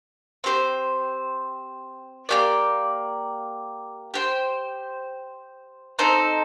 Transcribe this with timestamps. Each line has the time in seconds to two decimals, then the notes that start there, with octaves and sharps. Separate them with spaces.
0.44 C4 G4 C5
2.29 A#3 D4 G4 D5
4.14 G4 C5 G5
5.99 C4 D#4 A4 C5